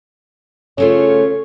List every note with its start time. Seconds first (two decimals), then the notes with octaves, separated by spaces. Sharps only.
0.78 C#3 A3 F4 C#5